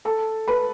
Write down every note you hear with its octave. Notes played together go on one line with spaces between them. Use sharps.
A4 A5
B4 B5